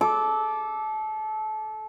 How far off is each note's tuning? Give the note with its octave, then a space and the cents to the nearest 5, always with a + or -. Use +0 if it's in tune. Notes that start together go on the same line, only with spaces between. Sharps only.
A4 -25 D6 +0